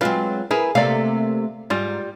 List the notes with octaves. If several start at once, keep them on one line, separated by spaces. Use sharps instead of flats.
F#3 G#3 C4 F4 B4
E4 G#4 A#4 B4
C3 A3 A#3 D5 F5
G#2 G3 F4